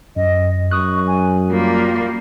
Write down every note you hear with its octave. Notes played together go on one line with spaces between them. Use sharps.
F#2 D#5
F#2 C#6 D#6 F#6
G#5
G3 A#3 F4